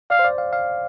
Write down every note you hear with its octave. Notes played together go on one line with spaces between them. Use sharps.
D5 F5
C5
D5
F5
F5